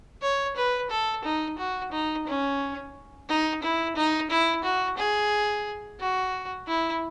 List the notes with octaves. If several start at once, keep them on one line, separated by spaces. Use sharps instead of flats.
C#5
B4
A4
D#4
F#4
D#4
C#4
D#4
E4
D#4
E4
F#4
G#4
F#4
E4